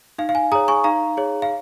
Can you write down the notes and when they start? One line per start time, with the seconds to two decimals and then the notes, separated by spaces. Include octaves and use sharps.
0.19 D#4 F5
0.29 F5
0.35 G#5
0.52 G#4 C#5 A#5 D#6
0.68 G#5 C#6
0.84 D#4 F5 A#5
1.17 G#4 C#5
1.42 F5